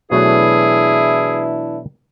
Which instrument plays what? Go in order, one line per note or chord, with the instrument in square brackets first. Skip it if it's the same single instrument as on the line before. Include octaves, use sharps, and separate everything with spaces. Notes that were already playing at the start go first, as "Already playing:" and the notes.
[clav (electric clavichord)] B2 F#3 A3 [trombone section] E3 D4 E4 [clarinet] G#4